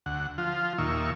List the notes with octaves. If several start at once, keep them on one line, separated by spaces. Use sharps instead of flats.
D2 F#5
F3 F4
D#2 A#2 D#3 E5 C#6